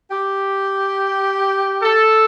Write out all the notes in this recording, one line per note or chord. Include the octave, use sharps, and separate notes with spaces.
G4
A4